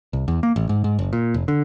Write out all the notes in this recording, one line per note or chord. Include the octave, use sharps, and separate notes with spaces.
C2
E2
A#3
A1
G#2
G#2
F#1
A#2
F1
D3